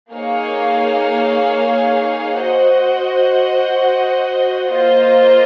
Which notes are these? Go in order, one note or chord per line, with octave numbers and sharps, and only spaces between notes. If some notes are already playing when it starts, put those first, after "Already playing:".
A#3 D#4 G#4 C#5 F5
F#4 C5 D#5 F#5
A#3 F4 C5 D#5